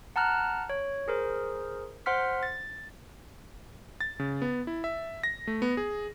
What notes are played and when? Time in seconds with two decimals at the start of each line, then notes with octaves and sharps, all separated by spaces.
0.16 F#5 A5 A#5 F6 F#6
0.70 C#5
1.08 G#4 A#4 C5
2.06 C5 F#5 C6 F6 B6
2.43 A6
4.01 A6
4.19 C#3
4.42 B3
4.67 E4
4.84 E5
5.24 A#6
5.47 A3
5.62 B3
5.77 G#4